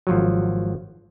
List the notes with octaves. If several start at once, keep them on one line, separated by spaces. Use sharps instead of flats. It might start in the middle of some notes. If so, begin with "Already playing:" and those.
G#1 F3 F#3